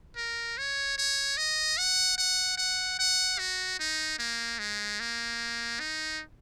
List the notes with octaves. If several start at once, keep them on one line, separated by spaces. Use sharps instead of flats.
A#4
C#5
C#5
D#5
F#5
F#5
F#5
F#5
F#4
D#4
A#3
G#3
A#3
D#4